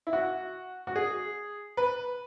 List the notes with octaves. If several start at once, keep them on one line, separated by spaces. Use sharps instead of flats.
E4
F#4
F#4
G#4
B4